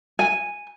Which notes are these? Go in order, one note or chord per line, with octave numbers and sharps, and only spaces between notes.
G#5